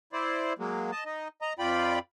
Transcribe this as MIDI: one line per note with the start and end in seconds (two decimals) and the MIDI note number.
0.13 0.53 64
0.13 0.53 72
0.13 0.53 74
0.59 0.91 54
0.59 0.91 56
0.59 0.91 58
0.92 1.04 75
0.92 1.04 81
1.06 1.28 63
1.06 1.28 75
1.42 1.53 75
1.42 1.53 82
1.59 1.99 41
1.59 1.99 65
1.59 1.99 74
1.59 1.99 79
1.59 1.99 83